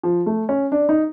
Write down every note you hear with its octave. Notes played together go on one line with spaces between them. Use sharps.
F3
A3
C#4
D4
D#4